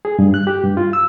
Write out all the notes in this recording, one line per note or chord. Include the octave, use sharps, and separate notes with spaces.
G#4
G2
F#6
G4
G2
F4
E6